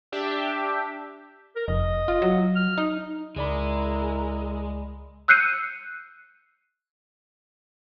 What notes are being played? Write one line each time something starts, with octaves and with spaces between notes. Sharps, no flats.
D4 G4 E5
A#4
F1 D#5
F4
F#3
F6
D#4
C#2 G#3 E4 A#4 D5 B5
E6 F#6 G6 C7 C#7 D#7